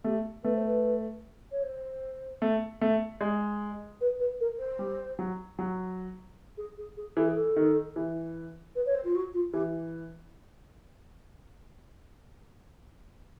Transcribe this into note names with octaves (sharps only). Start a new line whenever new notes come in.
A3 G4
A3 B4
C5
B4
C#5
C5
A3
A3
G#3
B4
B4
A#4
C5
G3
F#3
F#3
G#4
G#4
G#4
E3 A4
G#4
A4
D#3
E3
B4
C#5
C5
F4
F#4
F4
E3 G4